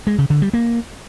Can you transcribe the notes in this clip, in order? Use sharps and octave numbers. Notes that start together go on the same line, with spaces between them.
G#3
C#3
D3
G3
A#3